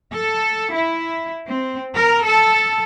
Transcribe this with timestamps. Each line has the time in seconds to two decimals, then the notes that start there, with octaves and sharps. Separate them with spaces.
0.12 A4
0.74 E4
1.48 C4
1.95 A#4
2.25 A4